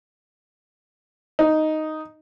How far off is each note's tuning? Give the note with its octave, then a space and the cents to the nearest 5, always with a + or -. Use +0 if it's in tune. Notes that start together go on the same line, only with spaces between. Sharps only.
D#4 +0